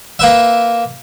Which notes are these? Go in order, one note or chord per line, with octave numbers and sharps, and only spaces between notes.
A#3 B4 E5